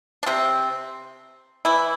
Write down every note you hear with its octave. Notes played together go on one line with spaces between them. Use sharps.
D4
C3 C4
E3 E4